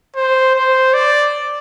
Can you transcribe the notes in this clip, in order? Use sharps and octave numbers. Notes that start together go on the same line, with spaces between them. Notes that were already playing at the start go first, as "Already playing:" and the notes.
C5
C5
D5